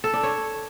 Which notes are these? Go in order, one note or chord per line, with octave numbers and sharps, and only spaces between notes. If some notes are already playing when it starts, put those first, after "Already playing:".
A4
D4
C#5